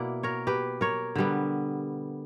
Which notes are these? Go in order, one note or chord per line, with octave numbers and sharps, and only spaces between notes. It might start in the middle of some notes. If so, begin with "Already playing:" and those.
Already playing: B2 A#3 E4 D5 F#5
A#4 C#5
G4 B4
A#4 C#5
D3 G3 B3